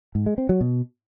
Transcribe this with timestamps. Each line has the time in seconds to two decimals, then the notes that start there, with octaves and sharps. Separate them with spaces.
0.15 G#2
0.26 G#3
0.38 C4
0.49 F#3
0.61 B2